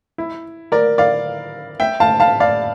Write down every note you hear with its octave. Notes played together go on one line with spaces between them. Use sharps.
E4
A#4 D5
D5 F5
E5 G5
F5 A5
F5 A5
D5 F5